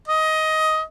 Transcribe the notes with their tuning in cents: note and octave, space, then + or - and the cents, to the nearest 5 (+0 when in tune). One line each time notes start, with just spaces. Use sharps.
D#5 +15